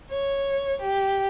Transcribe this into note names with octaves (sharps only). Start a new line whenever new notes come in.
C#5
G4